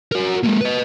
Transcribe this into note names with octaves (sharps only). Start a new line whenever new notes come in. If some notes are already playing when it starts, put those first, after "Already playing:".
F#4 A#4
G#3 A#3
B4 D#5